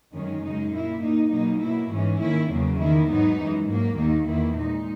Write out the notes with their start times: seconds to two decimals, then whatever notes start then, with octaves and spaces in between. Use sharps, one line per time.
0.13 F#2 D#3 G#3 C#4
0.42 F#2 C#3 G#3 D#4
0.72 A#2 A#3 E4
1.02 A#2 A#3 D#4
1.31 B2 F#3 A#3 D#4
1.60 B2 F#3 A#3 E4
1.90 G#2 E3 G#3 C#4
2.20 D#3 A#3 C#4 E4
2.49 E2 C#3 F#3 A#3
2.79 D#3 A#3 E4
3.09 G#2 F#3 B3 D#4
3.38 F#2 E3 G#3
3.68 G#2 F#3 A#3
3.98 D#2 D#3 A#3 D#4
4.27 E2 D#3 A#3 E4
4.57 A#2 G#3 D#4